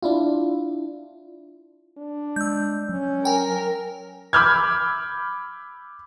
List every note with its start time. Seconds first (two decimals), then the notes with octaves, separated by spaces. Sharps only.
0.03 D4 E4 F4
1.98 D4
2.36 G#3 E6 G6
2.89 F#3 C#4
3.25 A#4 G5 G#5
4.33 B5 D6 E6 F6 G6 G#6